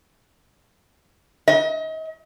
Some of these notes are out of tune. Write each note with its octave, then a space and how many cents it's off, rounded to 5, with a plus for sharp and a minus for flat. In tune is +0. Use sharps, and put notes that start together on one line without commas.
D#5 +35